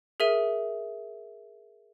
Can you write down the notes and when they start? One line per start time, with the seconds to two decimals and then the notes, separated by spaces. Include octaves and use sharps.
0.20 G#4 A#4 E5 D#7